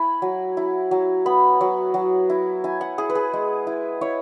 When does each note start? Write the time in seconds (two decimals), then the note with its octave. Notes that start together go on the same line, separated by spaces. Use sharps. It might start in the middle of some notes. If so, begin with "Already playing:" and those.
Already playing: E4 G#5 B5
0.22 F#3
0.57 E4
0.91 F#3
1.26 B3 B5
1.61 F#3
1.94 F#3
2.30 E4
2.64 E4 G#5
2.81 F#5
2.98 E4 G#4
3.10 B4
3.15 G#4
3.33 G#3
3.67 E4
4.01 E4 C#5